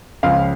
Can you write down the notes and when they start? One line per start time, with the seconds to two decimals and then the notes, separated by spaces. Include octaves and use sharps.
0.23 C#2 C#3 F3 F5